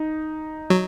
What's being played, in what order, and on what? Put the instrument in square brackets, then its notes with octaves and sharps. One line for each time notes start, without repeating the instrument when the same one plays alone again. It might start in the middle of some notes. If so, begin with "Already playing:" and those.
Already playing: [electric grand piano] D#4
[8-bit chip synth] F#3